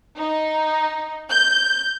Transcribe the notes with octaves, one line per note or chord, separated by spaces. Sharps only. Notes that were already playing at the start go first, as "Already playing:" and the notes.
D#4
G6